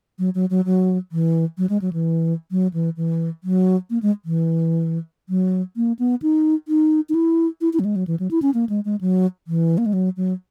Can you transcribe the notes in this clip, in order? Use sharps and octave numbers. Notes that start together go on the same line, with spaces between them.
F#3
F#3
F#3
F#3
E3
F#3
G#3
F#3
E3
F#3
E3
E3
F#3
A#3
G#3
E3
F#3
A#3
B3
D#4
D#4
D#4
E4
E4
E4
F#3
G#3
F#3
E3
F#3
E4
C#4
A#3
G#3
G#3
F#3
E3
A#3
G#3
F#3
F#3